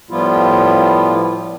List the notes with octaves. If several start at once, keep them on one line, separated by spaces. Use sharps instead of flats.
A2 F3 G3 B3 E4 F4